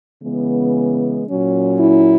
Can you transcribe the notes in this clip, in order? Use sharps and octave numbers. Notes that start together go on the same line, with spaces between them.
C#3 E3 G#3 B3
A#2 F#3 C#4
E4